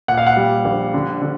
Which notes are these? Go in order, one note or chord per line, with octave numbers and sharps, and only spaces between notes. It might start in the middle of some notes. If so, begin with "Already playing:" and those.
A#2 F#5
F5
F#5
G3
A#1
D3
D3